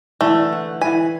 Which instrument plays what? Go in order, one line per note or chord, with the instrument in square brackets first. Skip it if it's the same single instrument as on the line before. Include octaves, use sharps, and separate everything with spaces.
[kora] D3 E3 [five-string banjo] A3
[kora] F#5
[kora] E3 B4 [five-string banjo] G#5